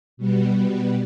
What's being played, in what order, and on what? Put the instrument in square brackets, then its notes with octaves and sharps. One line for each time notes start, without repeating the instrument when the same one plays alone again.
[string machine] B2 G3 B3